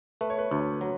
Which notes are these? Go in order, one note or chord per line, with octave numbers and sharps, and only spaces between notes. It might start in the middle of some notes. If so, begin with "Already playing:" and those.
A3 B4
C#5
B4
D2 C#5
F#3